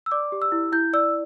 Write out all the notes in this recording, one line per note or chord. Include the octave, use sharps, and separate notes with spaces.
E6
D5 D6
G4
E6
E4
E4 G6
D5 E6